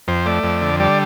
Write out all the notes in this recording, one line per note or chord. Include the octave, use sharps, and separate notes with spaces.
F2 C5
A3 D5
F2
D3
G3 D5